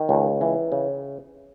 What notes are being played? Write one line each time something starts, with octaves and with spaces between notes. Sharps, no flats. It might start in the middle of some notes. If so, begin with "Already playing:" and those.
Already playing: D#3
C#2
E3
C#3